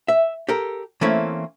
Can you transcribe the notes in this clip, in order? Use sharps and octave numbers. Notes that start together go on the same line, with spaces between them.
E5
G4 A4 A#4
E3 A3 A#3 C4 C#4 E4